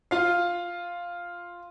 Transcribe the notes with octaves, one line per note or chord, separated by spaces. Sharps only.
F4 F5